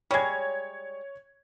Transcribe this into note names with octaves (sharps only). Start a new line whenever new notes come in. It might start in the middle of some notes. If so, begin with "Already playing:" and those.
G3 G#3 C#5 G#6